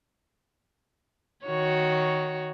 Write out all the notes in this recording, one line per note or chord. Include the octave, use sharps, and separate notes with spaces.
D#3 F#4 C#5